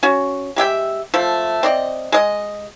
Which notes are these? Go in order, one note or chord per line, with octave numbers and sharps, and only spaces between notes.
C#4 F#4
G#3 G4 E5 G5
F3 A3
C4 D5 D#5
G#3 D#5